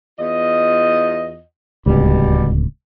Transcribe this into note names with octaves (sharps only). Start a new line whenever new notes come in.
E2 F4 D#5
D1 C#2 B2 G3